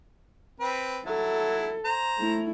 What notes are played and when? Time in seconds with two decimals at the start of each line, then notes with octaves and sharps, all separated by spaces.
0.60 C4 B4
1.06 F#3 E4 A4
1.85 C5 A#5
2.19 A3 E4